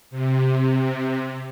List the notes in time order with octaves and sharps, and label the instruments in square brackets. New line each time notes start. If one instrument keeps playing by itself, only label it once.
[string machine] C3